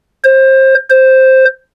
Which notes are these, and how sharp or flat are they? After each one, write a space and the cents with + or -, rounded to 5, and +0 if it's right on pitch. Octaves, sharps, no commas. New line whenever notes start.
C5 +25
C5 +5